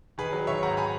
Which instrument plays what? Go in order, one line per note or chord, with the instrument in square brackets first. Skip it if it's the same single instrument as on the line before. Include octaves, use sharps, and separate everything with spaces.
[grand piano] D#3 G#4 B4
F#3
D#3 C#5 E5
G#2 F#5 A#5
G#5 B5